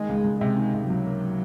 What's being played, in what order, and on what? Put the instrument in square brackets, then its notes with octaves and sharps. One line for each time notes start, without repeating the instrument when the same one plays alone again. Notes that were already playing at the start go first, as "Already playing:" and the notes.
Already playing: [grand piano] D#3 [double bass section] G#3
[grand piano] C#2
C#2
[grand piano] C3 [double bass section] G#3
[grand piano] D#3
C3
[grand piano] C#2 [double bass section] F#3
[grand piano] A#3